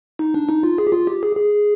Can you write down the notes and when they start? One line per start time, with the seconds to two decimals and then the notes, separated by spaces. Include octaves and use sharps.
0.19 D#4
0.34 D4
0.49 D#4
0.63 F4
0.78 G#4
0.87 G4
0.92 F4
1.07 G4
1.23 G#4
1.37 G#4